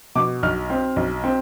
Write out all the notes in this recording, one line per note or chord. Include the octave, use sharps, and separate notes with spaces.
B2 D6
B1 F6
C4
B1
C4